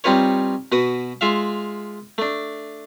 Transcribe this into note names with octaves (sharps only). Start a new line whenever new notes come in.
G3 C4 D#4 F4 B4 C#5
B2 F#4 B4 D#6
G#3 F4 E5 F5
A3 D4